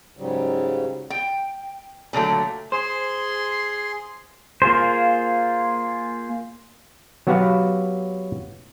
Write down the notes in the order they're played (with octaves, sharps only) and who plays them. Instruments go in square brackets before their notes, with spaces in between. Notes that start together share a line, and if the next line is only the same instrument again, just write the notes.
[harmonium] G#2 C#3 F#3 G3
[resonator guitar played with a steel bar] G5
A#2 D3 F#3 A3
[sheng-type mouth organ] G#4 C6 [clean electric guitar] C5
[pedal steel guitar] A#3 F4 G#4 C5
[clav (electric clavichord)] F#3 B3 F#4 G4 B4 F5